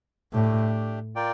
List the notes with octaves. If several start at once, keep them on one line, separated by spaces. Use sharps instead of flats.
A2 A3 D4 G4
F4 A#4 D5 G5